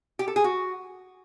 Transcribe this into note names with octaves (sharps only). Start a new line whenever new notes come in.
G4
A4
G#4
F#4